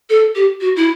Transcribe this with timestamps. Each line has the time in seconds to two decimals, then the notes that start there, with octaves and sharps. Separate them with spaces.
0.10 A4
0.35 G4
0.61 F#4
0.76 E4